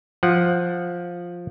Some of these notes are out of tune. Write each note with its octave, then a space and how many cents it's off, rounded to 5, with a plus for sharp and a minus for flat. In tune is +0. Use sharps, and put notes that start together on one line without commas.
F3 +5 F#5 +0